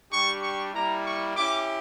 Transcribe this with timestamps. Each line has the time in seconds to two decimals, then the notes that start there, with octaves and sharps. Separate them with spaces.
0.11 G3 D4 G4 C#6
0.42 C#6
0.73 G3 A#3 E4 A#5
1.05 C#6
1.36 C#4 E4 G4 D6